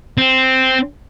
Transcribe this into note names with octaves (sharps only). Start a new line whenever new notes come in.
C4